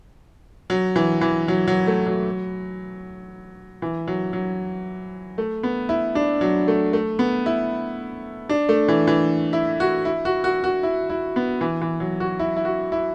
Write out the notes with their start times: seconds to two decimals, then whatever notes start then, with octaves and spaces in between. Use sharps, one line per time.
0.70 F#3
0.96 E3
1.21 E3
1.48 F#3
1.67 F#3
1.87 A3
2.07 F#3
3.82 E3
4.07 F#3
4.33 F#3
5.38 A3
5.63 B3
5.89 E4
6.15 D4
6.41 F#3
6.68 A3
6.93 A3
7.19 B3
7.46 E4
8.49 D4
8.69 A3
8.88 E3
9.07 E3
9.53 E4
9.80 F#4
10.05 E4
10.25 F#4
10.44 F#4
10.64 F#4
10.83 E4
11.10 E4
11.36 B3
11.61 E3
11.82 E3
12.00 F#3
12.20 F#4
12.39 E4
12.56 E4
12.65 F#4
12.92 E4